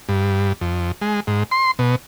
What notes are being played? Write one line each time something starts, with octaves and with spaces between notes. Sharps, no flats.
G2
F2
G#3
G#2
C6
B2